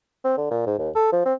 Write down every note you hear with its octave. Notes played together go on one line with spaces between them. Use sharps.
C4
D3
A#2
G#2
D#2
A4
F3
C4